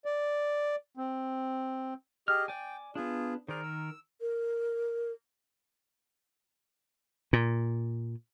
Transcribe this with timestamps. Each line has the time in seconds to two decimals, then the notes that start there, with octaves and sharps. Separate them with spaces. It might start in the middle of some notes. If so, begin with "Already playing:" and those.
0.05 D5
0.97 C4
2.28 G4 G#4 D#5 F6
2.48 D5 G5 G#5
2.95 B3 D4 F4 G#4
3.48 D#3 G#4 A#4 C5 D5
3.63 E6
4.21 A#4
7.33 A#2